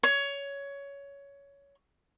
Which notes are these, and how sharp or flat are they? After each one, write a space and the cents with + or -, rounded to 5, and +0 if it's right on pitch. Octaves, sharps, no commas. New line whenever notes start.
C#5 +15